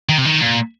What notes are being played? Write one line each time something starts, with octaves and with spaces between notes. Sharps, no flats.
D#3
C3
D#3
A#2